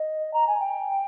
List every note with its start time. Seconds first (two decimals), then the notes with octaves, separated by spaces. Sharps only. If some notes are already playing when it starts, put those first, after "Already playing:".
Already playing: D#5
0.34 A#5
0.47 G#5
0.60 G5